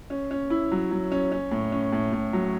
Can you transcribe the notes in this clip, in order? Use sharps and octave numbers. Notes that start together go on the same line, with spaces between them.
C#4
C#4
E4
F#3
F#3
C#4
C#4
A2
C#4
A2
A2
F#3